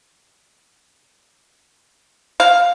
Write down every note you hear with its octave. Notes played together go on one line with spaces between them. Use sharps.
F5